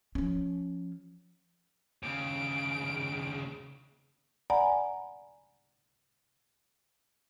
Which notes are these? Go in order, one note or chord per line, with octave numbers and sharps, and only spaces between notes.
F3 C#4
D#2 C#3 D7
D5 F#5 G#5 A#5 B5